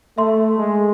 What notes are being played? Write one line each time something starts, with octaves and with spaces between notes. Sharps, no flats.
A3 E5 C6
G#3